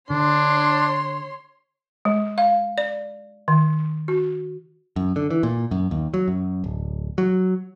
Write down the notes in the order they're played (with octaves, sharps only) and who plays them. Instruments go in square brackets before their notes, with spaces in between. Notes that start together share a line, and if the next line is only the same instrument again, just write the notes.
[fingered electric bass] D3 [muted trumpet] D4 [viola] C#5 C6
[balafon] G#3
F5
D5
D#3
F#4
[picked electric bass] F#2
D3
E3
A#2
F#2
D#2
F#3
F#2
D1
F#3